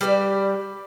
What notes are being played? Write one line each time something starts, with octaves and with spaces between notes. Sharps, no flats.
G3 G4 B4 D5